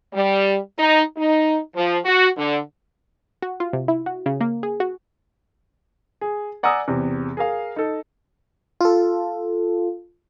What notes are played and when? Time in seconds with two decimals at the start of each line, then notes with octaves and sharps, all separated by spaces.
0.14 G3
0.77 D#4
1.17 D#4
1.75 F3
2.05 F#4
2.37 D3
3.42 F#4
3.60 F4
3.73 C3
3.88 E4
4.06 F#4
4.26 C#3
4.41 A#3
4.63 G#4
4.80 F#4
6.21 G#4
6.63 D5 F#5 G#5 A#5 D#6 E6
6.88 E2 C3
7.37 G#4 A#4 F5
7.76 D#4 A4
8.81 F4 A4